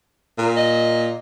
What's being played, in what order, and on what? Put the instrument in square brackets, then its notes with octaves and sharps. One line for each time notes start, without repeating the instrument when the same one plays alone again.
[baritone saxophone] A#2
[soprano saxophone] D#5